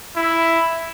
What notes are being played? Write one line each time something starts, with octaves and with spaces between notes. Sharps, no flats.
E4